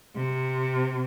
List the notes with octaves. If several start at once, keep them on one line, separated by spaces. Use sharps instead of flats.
C3